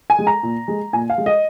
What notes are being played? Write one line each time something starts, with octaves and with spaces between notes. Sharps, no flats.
G#5
G#3
A#5
A#2
G#3
A#2 G#5
F5
G#3
D#5